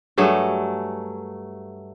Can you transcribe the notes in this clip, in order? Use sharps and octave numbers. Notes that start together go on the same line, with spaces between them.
G2 F#3 A3 G#4